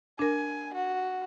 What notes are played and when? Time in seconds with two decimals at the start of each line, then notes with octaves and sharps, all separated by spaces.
0.19 D4 A#4 G#5
0.74 F#4